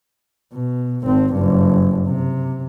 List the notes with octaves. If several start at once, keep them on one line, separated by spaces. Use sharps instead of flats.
B2
G#1 C4
F#1 G2
C3